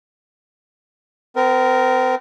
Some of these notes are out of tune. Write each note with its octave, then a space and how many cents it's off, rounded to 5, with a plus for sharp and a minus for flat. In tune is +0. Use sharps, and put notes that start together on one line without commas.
C4 -35 A#4 +0